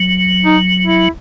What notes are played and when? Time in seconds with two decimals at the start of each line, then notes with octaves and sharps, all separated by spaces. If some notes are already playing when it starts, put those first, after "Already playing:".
Already playing: F#3
0.45 D#4
0.84 E4